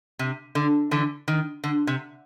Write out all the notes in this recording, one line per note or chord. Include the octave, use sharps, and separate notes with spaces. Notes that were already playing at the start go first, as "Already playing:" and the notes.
C3
D3
D3 E3
D#3
D3
C3